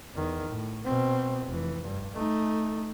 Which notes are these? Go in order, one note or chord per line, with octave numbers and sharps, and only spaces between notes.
E2 D#3
A2
B2 C4
F1 E3
G2
A3 D#4